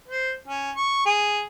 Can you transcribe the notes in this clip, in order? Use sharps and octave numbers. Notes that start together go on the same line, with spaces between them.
C5
C#4
C#6
G#4